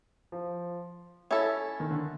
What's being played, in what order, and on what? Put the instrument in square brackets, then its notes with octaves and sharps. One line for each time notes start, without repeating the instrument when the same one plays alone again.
[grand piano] F3
[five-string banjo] C#4 E4 A4
[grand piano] D#3
D3